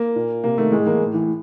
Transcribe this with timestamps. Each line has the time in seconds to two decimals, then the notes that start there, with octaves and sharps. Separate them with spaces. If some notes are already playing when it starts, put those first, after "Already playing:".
Already playing: A#3
0.16 A#2
0.44 C3 A#3
0.58 D#3 A3
0.72 A2 G#3
0.86 E3 A#3
1.00 A2
1.14 E3